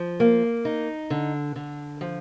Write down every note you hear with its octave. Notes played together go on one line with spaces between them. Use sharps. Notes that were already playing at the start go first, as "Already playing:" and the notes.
Already playing: F3
A#3
D#4
D3
D3
F3